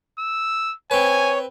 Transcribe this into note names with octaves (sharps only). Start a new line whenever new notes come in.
E6
C4 B4 C#5 G#5